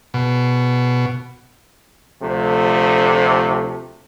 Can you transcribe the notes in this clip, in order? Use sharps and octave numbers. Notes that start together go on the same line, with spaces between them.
B2
D2 C3 F3 A3